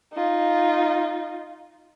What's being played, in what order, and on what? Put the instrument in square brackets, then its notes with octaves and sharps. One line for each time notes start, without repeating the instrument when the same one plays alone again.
[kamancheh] D#4 F4